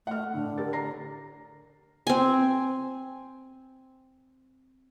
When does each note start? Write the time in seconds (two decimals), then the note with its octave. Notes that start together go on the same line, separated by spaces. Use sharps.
0.07 A3 F#5 F6
0.34 A2 D3
0.58 G4 A#4 A6
0.73 A#5 A#6 C7
2.07 C4 G#5